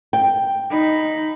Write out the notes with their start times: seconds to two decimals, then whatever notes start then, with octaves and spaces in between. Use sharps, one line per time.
0.13 G5
0.70 D#4 B5